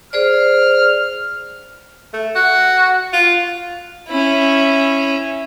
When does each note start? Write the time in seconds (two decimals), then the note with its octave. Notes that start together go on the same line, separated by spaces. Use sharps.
0.13 G#4 C5 D5 F6
2.14 A3
2.35 F#4
3.13 F4
4.08 C#4 E4